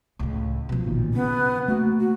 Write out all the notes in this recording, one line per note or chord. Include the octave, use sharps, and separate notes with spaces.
C#2 A2
B2 F3
A1 A#2 D#3
C#3 B3
A3 A#3 F#4
F#4